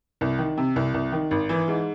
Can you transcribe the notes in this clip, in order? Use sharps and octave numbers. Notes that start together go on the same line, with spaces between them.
C2
D#3
C3
C2
C2
D#3
G#1
E3
G#2